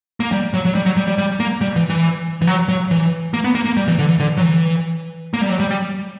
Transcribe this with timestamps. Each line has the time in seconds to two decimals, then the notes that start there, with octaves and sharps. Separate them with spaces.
0.20 A#3
0.32 G3
0.54 F#3
0.65 F#3
0.75 G3
0.86 F#3
0.97 G3
1.08 G3
1.18 G3
1.40 A#3
1.61 G3
1.76 E3
1.90 E3
2.42 E3
2.47 F#3
2.68 F#3
2.91 E3
3.34 A#3
3.44 B3
3.55 A#3
3.65 A#3
3.77 G3
3.88 E3
3.99 D3
4.09 E3
4.20 D3
4.37 F#3
4.41 E3
5.34 A#3
5.41 G3
5.49 F#3
5.60 G3
5.71 G3